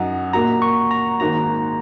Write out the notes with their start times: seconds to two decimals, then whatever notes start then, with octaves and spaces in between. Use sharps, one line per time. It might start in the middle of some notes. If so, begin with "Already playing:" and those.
Already playing: F#2 F#3 D#4 F#5
0.33 A#2 A#3 F#4 A#5
0.62 C#6
0.91 A#5
1.20 G#1 G#2 D#3 A#3 F#4 A#5